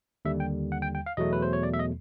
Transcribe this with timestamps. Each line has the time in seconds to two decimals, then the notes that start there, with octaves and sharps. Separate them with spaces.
0.25 D#2 D3 G3 E5
0.40 G5
0.72 F#5
0.82 G5
0.95 G5
1.06 F5
1.17 E2 B2 F#3 A3 D#5
1.33 B4
1.42 C5
1.53 C#5
1.63 D5
1.74 E5
1.79 D#5